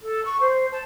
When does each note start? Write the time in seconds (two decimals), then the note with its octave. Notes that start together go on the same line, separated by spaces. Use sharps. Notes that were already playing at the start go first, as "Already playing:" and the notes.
0.02 A4
0.25 C#6
0.41 C5
0.72 A5